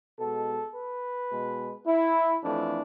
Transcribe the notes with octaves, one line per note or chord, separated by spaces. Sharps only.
B2 G#3 A4
B4
B2 G#3
E4
F2 E3 A3 D4